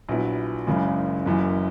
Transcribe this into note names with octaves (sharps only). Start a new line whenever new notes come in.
A#1 A#2 F#3 B3 E4
F#1 F#2 C#3 E3 G#3
F#1 F#2 E3